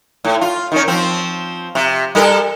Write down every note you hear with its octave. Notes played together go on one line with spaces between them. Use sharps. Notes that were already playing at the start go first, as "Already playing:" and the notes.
A2
F4
D#3 C#4
F3 C4
C3
G3 A4 A#4